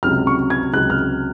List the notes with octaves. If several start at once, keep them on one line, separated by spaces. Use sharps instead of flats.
C#2 C3 F#3 F6
C#6
G#6
C#2 C3 F#3 F#6
F6